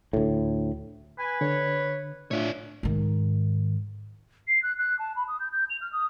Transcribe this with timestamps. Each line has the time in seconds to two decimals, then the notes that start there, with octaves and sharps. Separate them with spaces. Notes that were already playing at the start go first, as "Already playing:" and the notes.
0.13 D2 A2
1.19 B4 G#5
1.41 D3 C#5
2.31 A2 D4 F4 C#5 D5 E5
2.83 G#2 D#3
4.48 C7
4.63 F#6
4.78 F#6
4.99 A5
5.16 B5
5.28 D#6
5.40 G6
5.52 G6
5.70 F7
5.81 F6
5.93 D#6